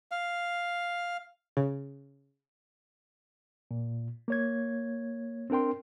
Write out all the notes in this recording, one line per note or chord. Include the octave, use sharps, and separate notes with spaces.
F5
C#3
A#2
A#3 C#5 G#6
C4 D4 A#4 G5 C6